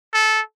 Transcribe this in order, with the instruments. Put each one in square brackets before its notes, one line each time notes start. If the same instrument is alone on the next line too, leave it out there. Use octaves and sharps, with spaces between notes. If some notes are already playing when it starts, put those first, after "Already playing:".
[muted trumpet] A4